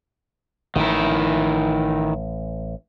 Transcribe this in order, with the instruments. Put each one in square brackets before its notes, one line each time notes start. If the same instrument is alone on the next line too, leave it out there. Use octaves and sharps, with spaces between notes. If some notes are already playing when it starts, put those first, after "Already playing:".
[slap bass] A1 [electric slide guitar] D#3 E4